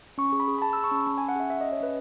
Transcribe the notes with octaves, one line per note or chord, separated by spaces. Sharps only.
C#4 C#6
G#4
B5
G#4
B5
G#4 A5
G#4 E6
C#6
C#4 B5
C#4 A5
C#4 G#5
F#5
G#4 E5
C#4 E5
C#4 D#5
C#5
C#4 B4